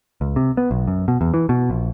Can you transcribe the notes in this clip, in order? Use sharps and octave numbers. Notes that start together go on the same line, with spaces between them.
C#2
C3
B3
B1
F#2
B2
E2
E3
B2
A#1